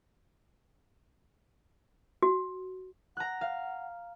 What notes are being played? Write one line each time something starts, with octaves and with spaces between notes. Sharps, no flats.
F#4
F#5 A#5 F#6
F5